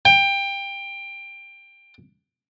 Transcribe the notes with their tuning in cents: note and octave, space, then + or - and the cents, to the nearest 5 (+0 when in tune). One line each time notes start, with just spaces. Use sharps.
G5 +20